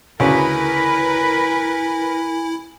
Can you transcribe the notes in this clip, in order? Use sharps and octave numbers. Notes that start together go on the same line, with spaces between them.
D2 C#3 C#4 E4 A#4 B4 G#5